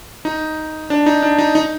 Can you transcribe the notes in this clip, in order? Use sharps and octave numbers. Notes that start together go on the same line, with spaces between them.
D#4
D4
D#4
D4
D#4
D#4